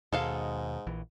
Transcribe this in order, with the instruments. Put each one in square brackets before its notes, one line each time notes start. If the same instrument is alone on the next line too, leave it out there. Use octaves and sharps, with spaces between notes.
[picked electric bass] D#2 B2 [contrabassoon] G#2 [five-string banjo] G#3 A4 F5
[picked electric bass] A#1 E3